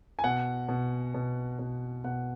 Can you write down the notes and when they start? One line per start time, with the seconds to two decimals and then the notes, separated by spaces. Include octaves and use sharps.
0.19 G#5
0.24 B2 F#5
0.69 B2
1.14 B2
1.59 B2
2.04 B2 F#5